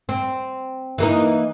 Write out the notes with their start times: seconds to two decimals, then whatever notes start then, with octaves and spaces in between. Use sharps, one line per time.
0.09 C4
0.98 E3 A#3 D#4